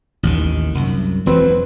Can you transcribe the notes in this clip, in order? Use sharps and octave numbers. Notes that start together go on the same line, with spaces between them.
A1 D#2 D#3
C2 F#2
E1 F2 E3 F#3 C4 B4